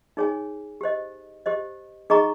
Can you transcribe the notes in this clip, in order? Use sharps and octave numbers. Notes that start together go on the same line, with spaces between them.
D#4 G#4 C#5 G#5
G4 C5 D#5
G4 C5 D#5
D#4 G#4 D#5 A#5 C#6